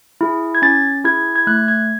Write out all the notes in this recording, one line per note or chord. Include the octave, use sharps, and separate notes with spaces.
E4 G#4
G#6
C#4 A6
E4 G#4 G#6
G#6
A3 F#6
G#6